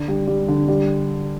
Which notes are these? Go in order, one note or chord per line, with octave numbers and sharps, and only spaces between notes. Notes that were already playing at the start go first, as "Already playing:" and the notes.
Already playing: D3
G3
G3
D3
G3